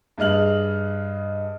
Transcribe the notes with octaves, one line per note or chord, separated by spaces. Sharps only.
G2 G#4 D#5 F6 F#7